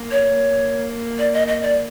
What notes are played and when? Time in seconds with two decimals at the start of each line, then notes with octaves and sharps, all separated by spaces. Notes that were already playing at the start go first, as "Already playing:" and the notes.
Already playing: A#3
0.11 C#5
0.32 A#3
1.19 D5
1.33 D#5
1.48 D#5
1.62 D5